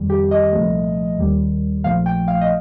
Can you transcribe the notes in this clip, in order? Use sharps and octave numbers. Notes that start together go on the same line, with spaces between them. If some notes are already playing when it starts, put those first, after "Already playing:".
Already playing: F2 D#3 G3
G4
D#5
C2 A#2 F3 A3
D#2 D#3 G3
A#1 A#2 F3 A3 F5
G5
F5
D#5